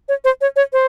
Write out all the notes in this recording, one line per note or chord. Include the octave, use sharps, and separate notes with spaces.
C#5
C5
C#5
C#5
C5